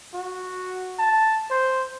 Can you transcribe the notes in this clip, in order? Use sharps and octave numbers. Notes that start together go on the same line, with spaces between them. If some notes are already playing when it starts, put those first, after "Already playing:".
F#4
A5
C5